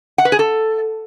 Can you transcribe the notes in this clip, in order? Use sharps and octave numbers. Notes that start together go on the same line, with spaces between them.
F#5
B4
G#4
A4